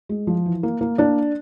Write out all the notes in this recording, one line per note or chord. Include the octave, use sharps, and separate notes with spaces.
G#3
F3
E3
A#3
A#3
A#3 D4 D5